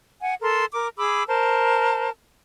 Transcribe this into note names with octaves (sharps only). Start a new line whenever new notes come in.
F#5 G#5
A4 A#4 C6
A#4 D6
G#4 B5 D6 E6
A#4 C5 A5